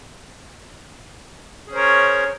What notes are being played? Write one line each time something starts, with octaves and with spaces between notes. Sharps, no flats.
C#4 G#4 A#4 C5 C#5